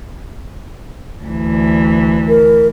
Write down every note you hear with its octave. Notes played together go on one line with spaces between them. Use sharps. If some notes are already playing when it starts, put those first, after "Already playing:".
D2 E3
A#4